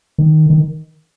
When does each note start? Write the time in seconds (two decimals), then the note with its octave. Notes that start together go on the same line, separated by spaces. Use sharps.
0.18 D#3
0.50 D#3